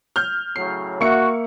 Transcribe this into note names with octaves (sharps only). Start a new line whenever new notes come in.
F6 G6
A2 C#3 F#3 C7
A#3 F#4 E5 C#6 C#7